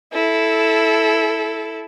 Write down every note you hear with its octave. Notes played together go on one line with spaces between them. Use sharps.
E4 A4